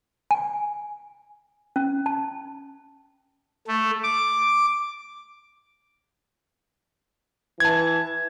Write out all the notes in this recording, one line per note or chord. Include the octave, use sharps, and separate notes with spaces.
G#5
C#4
A5
A3
D6
E3 A5 G#6